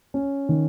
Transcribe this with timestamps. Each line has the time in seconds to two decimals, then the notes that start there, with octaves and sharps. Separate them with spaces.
0.14 C#4
0.49 D#3